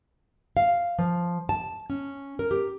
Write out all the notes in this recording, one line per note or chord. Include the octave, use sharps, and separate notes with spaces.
F5
F3
A5
C#4
A#4
G4